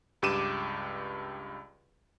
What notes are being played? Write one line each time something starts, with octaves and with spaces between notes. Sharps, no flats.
C#2 G2 G4 D6 D#7 E7